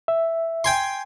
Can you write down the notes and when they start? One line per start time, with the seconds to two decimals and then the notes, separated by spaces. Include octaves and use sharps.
0.08 E5
0.64 G5 G#5 C6